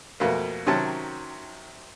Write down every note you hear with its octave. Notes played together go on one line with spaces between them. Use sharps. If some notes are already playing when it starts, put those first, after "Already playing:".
F2 B2 A3 A#3
C3 D#3 F#3 C#4 A5